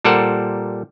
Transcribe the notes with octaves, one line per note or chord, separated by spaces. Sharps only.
A#2 G3 A4 A#4 C5 F#5